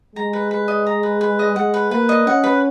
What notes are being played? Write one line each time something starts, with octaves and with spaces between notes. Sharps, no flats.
G#3 A#5
B4
B4
D#5
A#5
B4
B4
D#5
G#3 F#5
B4
A#3 B4
D#5
C#4 F#5
B4